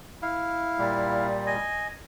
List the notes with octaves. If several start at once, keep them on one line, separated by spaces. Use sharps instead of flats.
E4 F5
A#2 G3
D#5 G#5